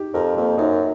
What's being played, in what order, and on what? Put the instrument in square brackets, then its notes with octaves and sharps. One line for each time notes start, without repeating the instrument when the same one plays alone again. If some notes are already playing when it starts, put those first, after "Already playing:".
Already playing: [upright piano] D#4 G4
[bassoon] F2 [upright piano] A#4
[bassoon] F2 [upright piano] A#3
[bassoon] F#2 [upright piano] D#4